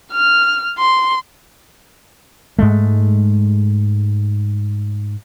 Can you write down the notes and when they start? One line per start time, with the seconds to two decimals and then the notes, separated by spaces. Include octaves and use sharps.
0.12 F6
0.78 C6
2.59 G#2 G#3 A3